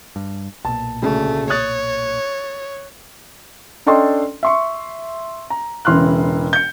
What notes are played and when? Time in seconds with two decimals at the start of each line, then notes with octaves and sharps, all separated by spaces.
0.16 G2
0.65 B1 A#2 A5
1.02 D2 C#3 A3
1.50 C#5 D#6 F#6 A6
3.86 C#4 D4 A4 D#5 G5 C6
4.43 E5 C6 C#6
5.50 A#5
5.85 E1 C#3 E3 C6 F6 F#6
6.53 G6 C#7